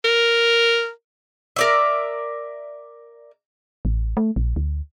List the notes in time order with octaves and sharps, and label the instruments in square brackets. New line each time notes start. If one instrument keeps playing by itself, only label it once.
[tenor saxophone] A#4
[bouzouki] A#4 D5 E5
[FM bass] A1
A3
A#1
D2